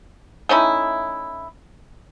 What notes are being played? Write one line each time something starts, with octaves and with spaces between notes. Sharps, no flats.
A3 C#4 D#4 E4